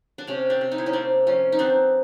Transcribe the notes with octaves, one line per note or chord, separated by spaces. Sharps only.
D4
C3 C#4
C4 D4
C3
D#4
E4
C#4 D#4
A#3 C4 D4
F3 C#4
D#4
B3 C4 D4